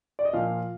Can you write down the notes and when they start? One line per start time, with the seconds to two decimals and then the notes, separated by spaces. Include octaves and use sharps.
0.19 D5
0.25 D#5
0.33 A#2 F3 F5